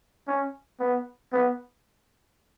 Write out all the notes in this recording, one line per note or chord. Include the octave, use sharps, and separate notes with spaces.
C#4
B3
B3